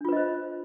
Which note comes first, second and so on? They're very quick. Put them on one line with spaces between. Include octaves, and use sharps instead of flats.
D4 F4 B4 D#5 C5